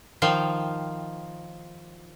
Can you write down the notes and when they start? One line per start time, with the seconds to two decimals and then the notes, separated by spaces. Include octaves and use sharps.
0.22 D#3 F3 F5 G5